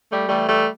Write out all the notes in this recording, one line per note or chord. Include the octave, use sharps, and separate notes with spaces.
G3 A3
E3 G3 A3
G3 A3